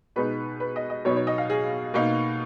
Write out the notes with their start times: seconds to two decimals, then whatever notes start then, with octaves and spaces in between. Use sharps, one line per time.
0.16 B2 G#3 B3 D#4 B4
0.60 B4
0.76 D#5
0.90 D#5
1.05 B2 F#3 B3 D#4 C#5
1.16 C#5
1.27 D#5
1.38 F5
1.50 G#4
1.94 B2 A#3 D#4